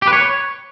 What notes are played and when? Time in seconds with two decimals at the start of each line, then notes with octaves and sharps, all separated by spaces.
0.02 G4
0.07 B4
0.13 C#5